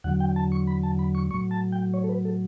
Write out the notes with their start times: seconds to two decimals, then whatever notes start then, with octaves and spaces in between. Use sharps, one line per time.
0.04 E2 D3 F#3 F#5
0.20 G5
0.36 A5
0.52 C#6
0.67 B5
0.83 A5
0.99 B5
1.15 C#6
1.31 F#3 C#6
1.34 A2
1.51 A5
1.72 G5
1.94 C#5
2.04 A4
2.09 B4
2.25 A4